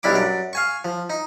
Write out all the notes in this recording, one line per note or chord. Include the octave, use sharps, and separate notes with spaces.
B1 G3 D4 E4 B5 D6
F#2 D5
F5 G#5 C#6
F3
D#4